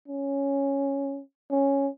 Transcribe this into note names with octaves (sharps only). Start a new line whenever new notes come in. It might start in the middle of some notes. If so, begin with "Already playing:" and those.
C#4
C#4